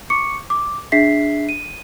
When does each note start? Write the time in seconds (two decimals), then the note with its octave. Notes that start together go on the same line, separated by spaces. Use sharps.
0.10 C#6 D6 C#7
0.50 D6
0.92 D4 G#4 E5 B6 C7
1.49 D#7